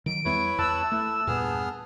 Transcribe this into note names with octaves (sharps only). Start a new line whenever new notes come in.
D#3 F#3 D7
E2 G3 B3 E4 B4 C#5
E2 A5 E6 F#6
A3 E4
E2 G2 A#2 B3 G#4 F6